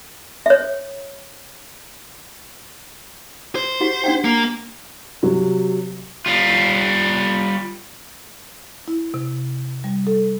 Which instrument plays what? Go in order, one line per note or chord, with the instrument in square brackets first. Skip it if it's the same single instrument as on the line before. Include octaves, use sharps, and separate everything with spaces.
[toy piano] C#5 E5
[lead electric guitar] C5
[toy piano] F#4 G4 F#5
D4 F#5 G5
[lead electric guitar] A#3
[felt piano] C3 F#3
[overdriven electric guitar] G3 F4
[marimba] E4
C3
G3
A4